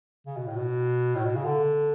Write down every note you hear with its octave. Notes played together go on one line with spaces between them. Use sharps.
C#3
B2
A2
B2
A2
B2
C#3
D3